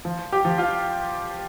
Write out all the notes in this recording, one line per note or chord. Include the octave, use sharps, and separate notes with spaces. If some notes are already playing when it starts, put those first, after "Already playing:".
F3
G4
F3
F4